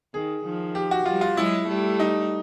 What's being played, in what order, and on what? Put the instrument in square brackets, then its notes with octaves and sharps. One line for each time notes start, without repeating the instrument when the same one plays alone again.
[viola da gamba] D#3 [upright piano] G#4
[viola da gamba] D#3 F3
[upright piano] G4
F#4
[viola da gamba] F3 G3 [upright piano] F4
[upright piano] F4
[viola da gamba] F#3 G#3 [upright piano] E4
[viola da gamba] G3 A3
[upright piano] D#4